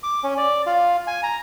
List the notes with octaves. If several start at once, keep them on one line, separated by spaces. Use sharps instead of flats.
D6
C#4
D5
F4
G#5
A#5